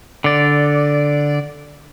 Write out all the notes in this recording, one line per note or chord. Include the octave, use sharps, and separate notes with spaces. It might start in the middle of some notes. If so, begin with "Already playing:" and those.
D3 D5